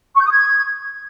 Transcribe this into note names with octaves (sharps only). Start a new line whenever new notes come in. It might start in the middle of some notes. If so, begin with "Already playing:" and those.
C#6
G6
D#6
G#6